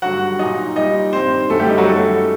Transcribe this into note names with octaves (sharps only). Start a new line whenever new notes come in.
G2 D3 F#3 F#4 F#5
A#2 F#3 D#4 D#5
A#2 G3 D#4 D#5
G2 D#3 G3 C4 C5
F#2 D3 F#3 A3 A4
G3 G4
D#4
F#3 F#4
F#2 D#3 G3 A3 A4